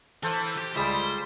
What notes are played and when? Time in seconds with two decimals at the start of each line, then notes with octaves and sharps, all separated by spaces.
0.23 E3 A4 C5 F5
0.58 G4
0.76 C#2 G3 G#4 C5 C#5 B5